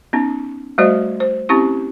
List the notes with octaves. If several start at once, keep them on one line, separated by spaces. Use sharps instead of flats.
B3 C#4 D#4
G3 A3 F#4 C5 D5 D#5
C5
C4 C#4 E4 G4 C#6